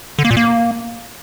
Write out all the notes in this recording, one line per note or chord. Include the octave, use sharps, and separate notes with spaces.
D3
A#3
A#2
A#3